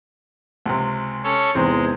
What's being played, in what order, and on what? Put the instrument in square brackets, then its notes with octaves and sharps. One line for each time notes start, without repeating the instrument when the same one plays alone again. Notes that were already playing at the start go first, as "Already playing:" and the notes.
[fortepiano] C#2 C3
[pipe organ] C#4 A4 C#5
[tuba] E2 [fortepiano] G#2 C3 C4 [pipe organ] G#3